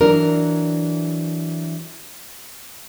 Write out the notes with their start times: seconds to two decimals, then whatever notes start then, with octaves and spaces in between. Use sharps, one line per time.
0.01 E3 F#3 D4 A#4